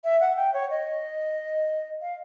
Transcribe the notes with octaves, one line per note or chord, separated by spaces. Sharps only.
E5
F#5
G5
C#5
D#5
F5